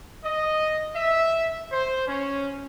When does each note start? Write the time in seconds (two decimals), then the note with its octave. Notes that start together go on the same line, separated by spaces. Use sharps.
0.24 D#5
0.95 E5
1.72 C5
2.08 C#4